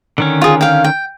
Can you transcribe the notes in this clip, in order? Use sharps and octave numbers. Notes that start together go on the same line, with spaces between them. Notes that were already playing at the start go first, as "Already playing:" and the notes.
D3 D#3 C#4
F4 G#4
F5 G5
G5